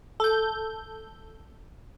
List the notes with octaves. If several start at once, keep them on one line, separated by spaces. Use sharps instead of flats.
A4 G6